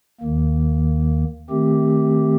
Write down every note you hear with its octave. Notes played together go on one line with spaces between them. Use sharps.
D#2 D#3 A#3
D#3 A3 C4 G4